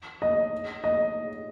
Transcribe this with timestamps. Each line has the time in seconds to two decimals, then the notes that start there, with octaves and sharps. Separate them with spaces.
0.22 D#5
0.84 D#5